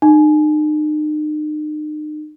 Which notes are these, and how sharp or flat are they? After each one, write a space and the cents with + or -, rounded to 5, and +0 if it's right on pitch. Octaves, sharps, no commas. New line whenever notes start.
D#4 -40